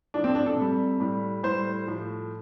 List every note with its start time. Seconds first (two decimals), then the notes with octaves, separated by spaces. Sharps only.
0.14 A2 F3 D4
0.24 C4
0.35 D4
0.46 A4
0.56 C3 G3
1.00 A2 G3
1.43 A2 G3 C5
1.87 A2 F3